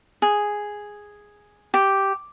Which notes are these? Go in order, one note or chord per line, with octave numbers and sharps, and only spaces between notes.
G#4
G4